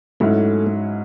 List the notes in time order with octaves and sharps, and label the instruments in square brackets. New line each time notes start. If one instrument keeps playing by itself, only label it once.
[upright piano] G#2 F#3 C#4 E4 [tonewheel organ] A3